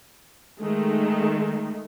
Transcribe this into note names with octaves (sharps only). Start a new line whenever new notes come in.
D#3 G#3 A3